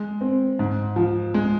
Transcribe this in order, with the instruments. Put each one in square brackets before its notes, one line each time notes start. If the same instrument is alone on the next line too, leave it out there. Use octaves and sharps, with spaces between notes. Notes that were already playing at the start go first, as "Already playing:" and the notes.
Already playing: [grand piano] G#3
C4
G#2
F3
G#3